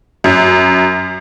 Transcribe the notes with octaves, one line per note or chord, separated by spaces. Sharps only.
F#2